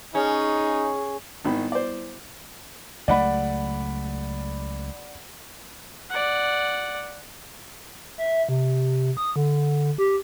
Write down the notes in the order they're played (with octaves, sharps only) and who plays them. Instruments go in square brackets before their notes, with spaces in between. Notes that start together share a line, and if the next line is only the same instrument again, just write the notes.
[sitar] C#4 [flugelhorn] D#4 [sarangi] G#4
[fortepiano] G#1 D#3 B5 [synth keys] G3 B3 E4
[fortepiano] C5 D5
[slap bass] C#2 F#3 A3 [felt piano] D5 F#5 B5
[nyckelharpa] D5 F#5
[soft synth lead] E5
C3
D#6
D3
G4